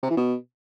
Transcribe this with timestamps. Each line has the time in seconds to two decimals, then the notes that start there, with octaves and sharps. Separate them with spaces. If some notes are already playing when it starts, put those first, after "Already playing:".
0.03 C3
0.10 E3
0.17 B2